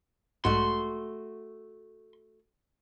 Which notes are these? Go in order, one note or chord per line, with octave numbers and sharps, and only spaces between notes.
B1 G#2 G#3 A3 F#4 C6